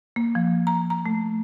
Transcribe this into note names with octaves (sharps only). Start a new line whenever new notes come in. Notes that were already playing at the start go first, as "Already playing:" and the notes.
A#3
F3
A#5
A#5
A3